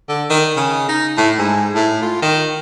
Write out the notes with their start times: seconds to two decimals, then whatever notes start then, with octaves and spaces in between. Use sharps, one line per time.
0.08 D3
0.30 D#3
0.57 C#3
0.89 D#4
1.17 A2
1.38 G#2
1.75 A2
2.03 F4
2.22 D#3